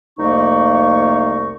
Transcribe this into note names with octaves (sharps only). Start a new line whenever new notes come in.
C2 F2 A3 A#3 D#4 C#6